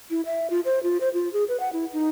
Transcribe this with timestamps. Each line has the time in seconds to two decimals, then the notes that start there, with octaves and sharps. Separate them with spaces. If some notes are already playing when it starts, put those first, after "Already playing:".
0.10 E4
0.26 E5
0.50 F4
0.65 C5
0.83 F4
1.01 C5
1.14 F4
1.33 G#4
1.48 B4
1.60 F#5
1.73 E4
1.93 D#4